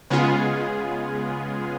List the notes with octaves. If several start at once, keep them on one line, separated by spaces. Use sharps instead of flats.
C#3 G#3 B3 F4 G#4